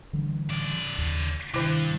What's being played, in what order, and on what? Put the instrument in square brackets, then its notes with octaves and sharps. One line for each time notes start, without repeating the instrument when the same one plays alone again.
[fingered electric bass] D3 E3 G3
[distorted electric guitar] C#3 D5
[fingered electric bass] D#2
[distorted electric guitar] G2 [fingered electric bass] C3 [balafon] D#3 E4